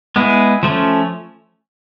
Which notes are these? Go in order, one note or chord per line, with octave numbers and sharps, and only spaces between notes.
G#3 B3 E4 G#4
F3 A3 C#4